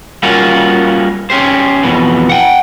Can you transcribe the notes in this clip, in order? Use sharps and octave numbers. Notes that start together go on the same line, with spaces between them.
G3 A#3 C#4 F4 F#4
C#4 G4 C5
F2 B2 E3
F#5 G5